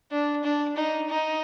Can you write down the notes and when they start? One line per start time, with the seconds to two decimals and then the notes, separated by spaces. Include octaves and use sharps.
0.11 D4
0.43 D4
0.76 D#4
1.10 D#4